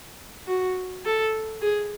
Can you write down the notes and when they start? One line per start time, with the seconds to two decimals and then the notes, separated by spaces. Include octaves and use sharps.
0.47 F#4
1.05 A4
1.61 G#4